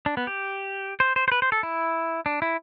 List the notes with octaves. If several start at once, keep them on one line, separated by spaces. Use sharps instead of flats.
D4
B3
G4
C5
C5
C5
B4
C5
A4
E4
D4
E4